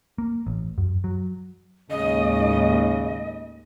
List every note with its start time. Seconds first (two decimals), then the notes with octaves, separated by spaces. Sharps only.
0.18 A#3
0.47 A1
0.78 F#2
1.04 F#3
1.90 D#2 A2 C#3 G#3 D#5